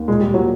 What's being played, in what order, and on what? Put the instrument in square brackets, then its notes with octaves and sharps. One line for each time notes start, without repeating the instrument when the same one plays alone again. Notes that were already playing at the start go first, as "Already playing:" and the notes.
Already playing: [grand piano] D#2
[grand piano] A#2 [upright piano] G#3
[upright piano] G3
[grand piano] A#2
[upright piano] F#3